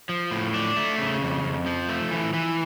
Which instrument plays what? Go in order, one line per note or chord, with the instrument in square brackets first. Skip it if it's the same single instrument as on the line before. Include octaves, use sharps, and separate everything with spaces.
[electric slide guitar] F3
A2
D4
A3
C#3
F2
F2
F3
A3
E3
E3